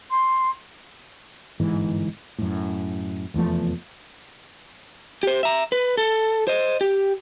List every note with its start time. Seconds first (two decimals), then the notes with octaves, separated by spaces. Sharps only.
0.10 C6
1.60 G1 G#2 E3
2.38 F#2 A2
3.34 F1 E2 F3 A3
5.23 G4 C5
5.43 E5 A#5
5.72 B4
5.97 A4
6.47 C5 D#5
6.81 G4